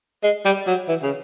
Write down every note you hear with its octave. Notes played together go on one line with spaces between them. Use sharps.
G#3
G3
F#3
E3
C#3